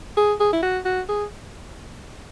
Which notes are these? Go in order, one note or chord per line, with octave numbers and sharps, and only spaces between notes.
G#4
G#4
E4
F#4
F#4
G#4